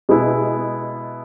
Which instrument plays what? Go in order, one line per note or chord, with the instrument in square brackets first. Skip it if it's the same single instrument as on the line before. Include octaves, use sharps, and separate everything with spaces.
[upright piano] B2 G#3 B3 E4